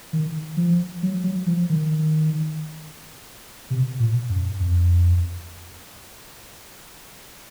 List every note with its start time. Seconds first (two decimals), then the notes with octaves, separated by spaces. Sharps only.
0.13 D#3
0.57 F3
1.03 F#3
1.24 F#3
1.47 F3
1.70 D#3
3.70 C3
4.00 A#2
4.29 F#2
4.60 F2